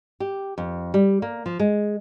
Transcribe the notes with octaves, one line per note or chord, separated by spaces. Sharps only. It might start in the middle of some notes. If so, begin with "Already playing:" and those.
G4
F2
G3
A#3
F3
G#3